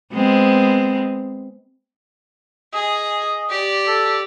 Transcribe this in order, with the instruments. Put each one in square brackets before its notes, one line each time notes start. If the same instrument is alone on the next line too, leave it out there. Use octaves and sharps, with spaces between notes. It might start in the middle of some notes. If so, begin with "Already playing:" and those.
[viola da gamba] G#3 B3 C4
[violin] G#4 [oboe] D#5
[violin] G4 D5
[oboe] A4